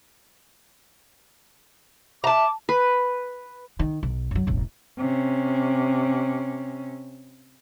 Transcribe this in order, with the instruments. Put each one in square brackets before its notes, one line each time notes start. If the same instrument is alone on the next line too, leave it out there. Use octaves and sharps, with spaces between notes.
[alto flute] E5 [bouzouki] A5 A#5 [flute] D6
[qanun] B4
[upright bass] D#3
B1
F#2 F#3
E1 A1
[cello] C3 C#4